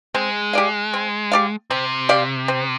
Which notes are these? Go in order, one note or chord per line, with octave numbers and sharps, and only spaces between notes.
G#3 C4
G4 D5 F5
C4
G4 D5 F5
C3 C4
G4 D5 F5
C4